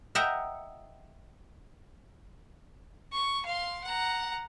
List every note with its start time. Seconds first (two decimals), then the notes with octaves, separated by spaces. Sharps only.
0.15 D#5 E5 F#5 G5 A#5
3.13 C#6
3.46 F5 C6
3.84 F#5 A#5